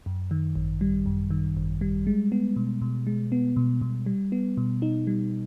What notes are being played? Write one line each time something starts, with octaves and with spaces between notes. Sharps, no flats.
F#2
D#3
G#1
G3
F#2
D#3
G#1
G3
G#3
B3
B2
B2
G#3
B3
B2
B2
G3
B3
B2
D#4
G3